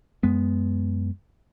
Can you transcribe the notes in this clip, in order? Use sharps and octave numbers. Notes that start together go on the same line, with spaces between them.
F#2 G#3 B3